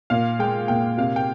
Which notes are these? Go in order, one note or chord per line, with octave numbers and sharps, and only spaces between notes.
A#2 F5
G#3 G5
A#2 G5
C3 F5
G5